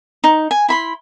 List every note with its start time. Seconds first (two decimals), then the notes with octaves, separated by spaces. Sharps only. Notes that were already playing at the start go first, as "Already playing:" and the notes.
0.24 D#4
0.51 G#5
0.69 E4 B5 C6